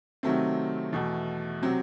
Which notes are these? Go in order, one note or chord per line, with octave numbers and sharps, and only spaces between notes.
C3 D#3 F#3 A3 C4
E2 B2 A3
C3 F#3 C4